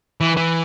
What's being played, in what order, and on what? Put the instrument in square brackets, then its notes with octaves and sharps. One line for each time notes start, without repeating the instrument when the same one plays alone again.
[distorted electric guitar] E3
E3